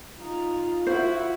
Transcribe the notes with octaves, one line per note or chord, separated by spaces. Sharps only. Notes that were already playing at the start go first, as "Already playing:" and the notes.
D#4 F4
E4 F#4 C5